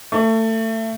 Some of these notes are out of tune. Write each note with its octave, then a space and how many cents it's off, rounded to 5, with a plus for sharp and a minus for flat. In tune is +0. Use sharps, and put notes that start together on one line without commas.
A3 +25